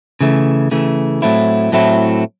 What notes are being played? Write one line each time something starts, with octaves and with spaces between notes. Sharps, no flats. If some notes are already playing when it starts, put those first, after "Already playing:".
C#3 E3 A3
C#3 E3 A3
A2 F#3 A3 C4 E4
A2 F#3 A3 C4 E4